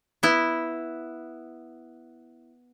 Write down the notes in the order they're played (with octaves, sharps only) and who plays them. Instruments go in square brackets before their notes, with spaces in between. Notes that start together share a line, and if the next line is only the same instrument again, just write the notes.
[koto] B3 E4